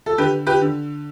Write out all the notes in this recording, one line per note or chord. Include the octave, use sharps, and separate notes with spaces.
A4
D3 G4 B4
G4 B4
D3